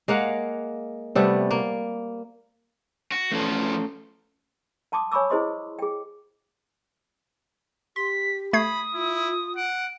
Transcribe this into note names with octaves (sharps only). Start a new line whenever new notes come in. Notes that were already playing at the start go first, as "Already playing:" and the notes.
G#3 A#3 F5 F#5
C3 G3 A3 B3
A#3
F#4
E2 F3 A3 C#4 A4
F#5 A5 C6 D6 D#6
C#5 G#5 B5 C#6 D6 E6
E4 G#4 C5 D#5 C6 D#6
G#4 G5
G4 C6 B6
A3 B5 D#6 G#6 C7
E4 F4
F#5 D7